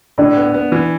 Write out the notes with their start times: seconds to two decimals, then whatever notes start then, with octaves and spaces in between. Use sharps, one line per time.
0.18 A2 D4 D5
0.37 B3
0.54 B3
0.72 E3